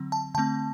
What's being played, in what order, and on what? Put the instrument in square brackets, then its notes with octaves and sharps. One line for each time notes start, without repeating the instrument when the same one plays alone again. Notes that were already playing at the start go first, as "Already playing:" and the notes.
Already playing: [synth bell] D3 F#3 C4
A5
D3 A3 C4 A5